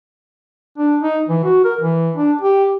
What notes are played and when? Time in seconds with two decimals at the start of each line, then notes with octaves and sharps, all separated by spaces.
0.78 D4
1.02 D#4
1.29 E3
1.44 F#4
1.64 A#4
1.81 E3
2.16 D4
2.41 G4